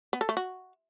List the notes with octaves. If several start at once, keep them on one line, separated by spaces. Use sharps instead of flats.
B3
A4
A3
F#4